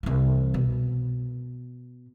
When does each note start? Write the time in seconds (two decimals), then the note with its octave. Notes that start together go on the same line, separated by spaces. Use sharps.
0.03 C2 E3
0.54 B2